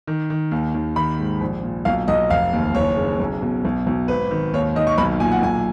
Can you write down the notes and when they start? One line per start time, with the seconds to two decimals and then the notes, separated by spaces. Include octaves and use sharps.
0.07 D#3
0.30 D#3
0.51 D#2
0.74 D#2
0.96 D#3 B5
1.19 G#2
1.41 A#1
1.63 A#2
1.85 B1 F5
2.08 B1 D#5
2.30 F1 F5
2.53 D#2
2.75 F#1 C#5
2.97 C#3
3.20 B1
3.42 B2
3.65 B1
3.87 B1
4.08 G#1 B4
4.31 D#3
4.54 D#2 C#5
4.76 D#3 D#5
4.87 C#6
4.98 B1 B5
5.20 A#2 G#5
5.32 F#5
5.42 B1 G#5